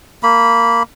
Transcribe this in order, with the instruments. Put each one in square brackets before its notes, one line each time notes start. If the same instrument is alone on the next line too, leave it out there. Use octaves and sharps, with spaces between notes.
[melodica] A#3 B5